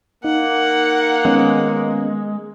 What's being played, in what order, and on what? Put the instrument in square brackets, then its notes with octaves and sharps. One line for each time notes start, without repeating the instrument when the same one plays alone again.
[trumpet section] A#3 [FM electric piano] D#4 [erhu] F#5
[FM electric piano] D#3 B3 C#4 [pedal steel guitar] G#3